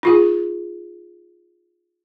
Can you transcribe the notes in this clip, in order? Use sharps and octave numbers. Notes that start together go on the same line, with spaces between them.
D#4 F4 G#4